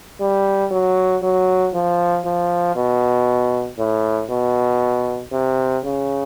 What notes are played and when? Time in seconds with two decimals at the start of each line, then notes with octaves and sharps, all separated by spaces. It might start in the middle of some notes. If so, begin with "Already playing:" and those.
0.20 G3
0.71 F#3
1.23 F#3
1.74 F3
2.25 F3
2.76 B2
3.79 A2
4.30 B2
5.32 C3
5.84 C#3